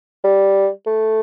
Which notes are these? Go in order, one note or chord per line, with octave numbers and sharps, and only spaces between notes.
G3
A3